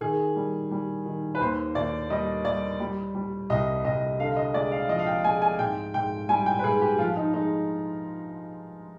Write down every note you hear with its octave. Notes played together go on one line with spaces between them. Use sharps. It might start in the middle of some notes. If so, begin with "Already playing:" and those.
D#3 G#4
G3
G3
D#3
B4
D#2 C5
D#2 D5
G3 D#5
G3 D5
G3
G3
C2 D#5
C2 D#5
D3 F5
D#5
G#3 D5
F5
F3 D#5
F5
G5
G#3 G#5
G#5
G#2 G5
G#2 G5
G3 G#5
G5
B4
G#2 G#4
G4
F3 F4
D#4
G#3 D#4